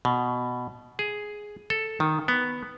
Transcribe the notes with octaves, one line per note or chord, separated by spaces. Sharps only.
B2
G#4
A4
D#3
B3